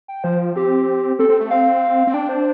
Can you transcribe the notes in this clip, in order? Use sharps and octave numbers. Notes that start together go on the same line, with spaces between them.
G5
F3 C5
C4 G4
C4 A4
C4
A3
C4 F5
C4
D4 G5
C5